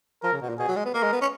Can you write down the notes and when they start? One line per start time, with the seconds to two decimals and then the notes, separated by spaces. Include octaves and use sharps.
0.23 F3 A#4
0.32 C#3
0.41 B2
0.49 A#2
0.59 B2 G#4
0.68 F#3
0.76 G#3
0.85 B3
0.94 A#3 A#4
1.03 G#3
1.12 B3
1.21 C#4